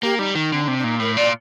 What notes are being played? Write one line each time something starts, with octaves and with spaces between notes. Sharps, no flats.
A#3 G4
G3 D#4
D#3
D3 C4
D#4
C3 D4
D4
A#2 D#4
A2 A#4
A#2 D5